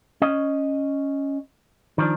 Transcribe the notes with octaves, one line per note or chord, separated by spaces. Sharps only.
C#4 D#5
D#3 F3 D4